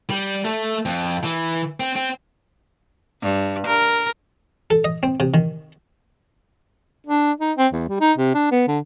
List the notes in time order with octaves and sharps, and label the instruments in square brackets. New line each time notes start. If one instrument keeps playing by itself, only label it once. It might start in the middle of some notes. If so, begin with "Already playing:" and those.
[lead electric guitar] G3
A3
F2
E3
C4
C4
[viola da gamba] G2
A#4
[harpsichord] A4
D#5
C4
C3
D#3
[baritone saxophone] D4
D#4
C4
E2
G3
D#4
C3
D4
B3
D3